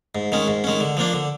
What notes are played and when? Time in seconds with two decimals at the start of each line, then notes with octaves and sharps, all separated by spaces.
0.15 G#2
0.32 D#3 G#3 C#4
0.48 G#2
0.64 D#3 G#3 C#4
0.80 D3
0.97 F3 A#3 D4
1.13 D3